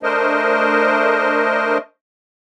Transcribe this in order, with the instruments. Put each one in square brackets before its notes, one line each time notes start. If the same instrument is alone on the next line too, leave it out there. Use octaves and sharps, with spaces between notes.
[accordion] A3 D4 A#4 C5 D#5